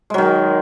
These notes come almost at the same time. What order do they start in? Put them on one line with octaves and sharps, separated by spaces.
G#3 F#3 D#3